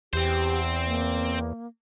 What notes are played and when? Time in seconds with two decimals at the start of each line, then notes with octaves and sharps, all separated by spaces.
0.13 E2 C4 G4 C5
0.86 A#3